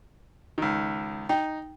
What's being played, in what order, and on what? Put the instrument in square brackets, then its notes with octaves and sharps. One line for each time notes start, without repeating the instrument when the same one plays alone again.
[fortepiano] C#2 D#3
[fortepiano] D#4 [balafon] G5